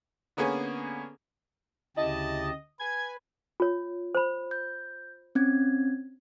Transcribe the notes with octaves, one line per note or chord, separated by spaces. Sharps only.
D3 A#3 B3 C#4 G#4 C#5
D2 C#3 E4 G4 D#5 A5
B4 G#5 G#6
F4 C#5
C5 B5
G6
C4 C#4 G#6